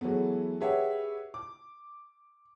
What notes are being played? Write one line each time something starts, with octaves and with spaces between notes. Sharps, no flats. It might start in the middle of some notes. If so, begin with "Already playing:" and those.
E3 F#3 G#3 A3 B3
G4 G#4 B4 C#5 E5 F#5
D6